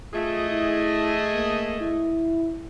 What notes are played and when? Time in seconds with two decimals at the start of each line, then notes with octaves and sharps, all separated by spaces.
0.13 A3 F4 G#4 D#5
0.51 E4
1.34 A#3
1.80 E4